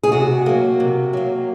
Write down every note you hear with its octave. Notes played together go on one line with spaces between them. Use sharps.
G#4
C3 F#4
F#3 A#3
C3
F#3 A#3